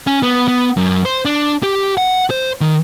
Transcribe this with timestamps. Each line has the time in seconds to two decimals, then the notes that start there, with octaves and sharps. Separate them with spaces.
0.07 C#4
0.23 B3
0.48 B3
0.77 F#2
1.05 C5
1.25 D4
1.63 G4
1.97 F#5
2.30 C5
2.61 D#3